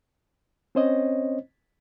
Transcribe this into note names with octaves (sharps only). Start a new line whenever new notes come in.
C4 C#4 C5 C#5 D#5